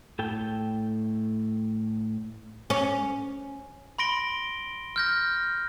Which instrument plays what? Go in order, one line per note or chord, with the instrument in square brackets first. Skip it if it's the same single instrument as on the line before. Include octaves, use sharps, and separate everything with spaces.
[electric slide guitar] A2 A4 G5
[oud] C#4
[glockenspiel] B5 C6 A#6 D7 G7
F6 G6 A#6